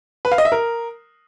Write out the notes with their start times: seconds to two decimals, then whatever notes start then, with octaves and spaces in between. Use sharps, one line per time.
0.25 B4
0.32 F5
0.38 D#5
0.45 E5
0.52 A#4